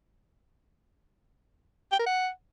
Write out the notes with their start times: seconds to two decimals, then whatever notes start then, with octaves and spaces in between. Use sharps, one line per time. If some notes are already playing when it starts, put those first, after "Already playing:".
1.92 G5
1.99 A#4
2.06 F#5